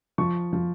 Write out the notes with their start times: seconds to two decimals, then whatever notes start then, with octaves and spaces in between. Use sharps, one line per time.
0.18 F3 C#6
0.53 F3